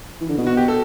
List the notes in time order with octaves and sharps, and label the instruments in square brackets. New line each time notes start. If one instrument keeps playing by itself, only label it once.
[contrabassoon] E3
D3
B2
[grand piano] F#4
G4
A4